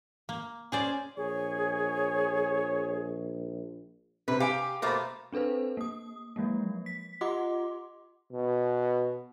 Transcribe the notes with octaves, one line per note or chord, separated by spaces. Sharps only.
A#3
C#4 G#4 C5 D5 G#5
A#1 G#4 C#5
C3 B4
G4 F5 G#5 D7
B2 A3 A#3 C5 B5
C4 D4 A4 B4 C5
A#3 D#6
F3 F#3 G#3 A#3
B6
F4 G4 D#5 F#5 C6 D6
B2